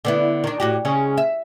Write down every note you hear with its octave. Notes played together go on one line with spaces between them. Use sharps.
D3 B3 E4
D#3 D4
A2 F#4 G4
C#3 G#3 C#4
E5